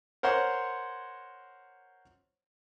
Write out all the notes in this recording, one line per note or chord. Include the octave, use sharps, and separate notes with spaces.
A#4 C5 C#5 F#5 C6